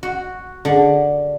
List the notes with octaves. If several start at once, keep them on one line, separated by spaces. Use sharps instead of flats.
F#4
D3